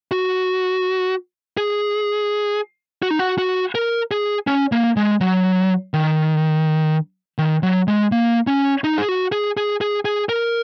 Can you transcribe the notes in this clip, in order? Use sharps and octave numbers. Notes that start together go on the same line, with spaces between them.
F#4
G#4
F#4
D#4
F#4
F#4
A#4
G#4
C#4
A#3
G#3
F#3
D#3
D#3
F#3
G#3
A#3
C#4
D#4
G#4
F#4
G#4
G#4
G#4
G#4
A#4